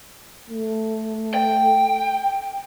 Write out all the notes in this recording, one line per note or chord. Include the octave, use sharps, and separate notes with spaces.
A3
G5